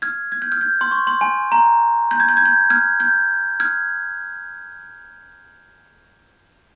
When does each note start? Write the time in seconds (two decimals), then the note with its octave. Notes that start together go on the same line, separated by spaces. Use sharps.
0.02 F6 G#6
0.32 G#6
0.42 G6
0.52 F6
0.61 G6
0.81 C6
0.91 C#6
1.07 C6
1.21 G#5
1.52 A#5
2.11 G6
2.20 G#6
2.29 G6
2.37 G#6
2.46 G6
2.70 F6 G#6
3.00 G6
3.60 F6 G#6